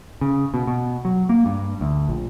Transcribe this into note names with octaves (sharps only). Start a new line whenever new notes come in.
C#3
B2
B2
F#3
A#3
G2
D2
A#1